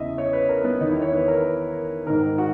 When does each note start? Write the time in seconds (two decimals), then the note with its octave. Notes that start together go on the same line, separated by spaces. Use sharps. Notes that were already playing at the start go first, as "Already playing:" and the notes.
Already playing: E2 C#3 E3 D#5 E5
0.18 C#5
0.33 B4
0.49 A#4
0.64 B3
0.80 E2 D#3 D#4
0.91 E4
1.02 C#5
1.13 B4
1.28 A#4
2.06 G#2 D#3 A#4
2.38 F#4